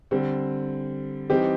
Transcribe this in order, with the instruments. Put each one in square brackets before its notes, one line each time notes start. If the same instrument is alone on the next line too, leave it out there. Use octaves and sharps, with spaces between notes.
[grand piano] D3 G3 C4
E3 G3 C4 D#4 G4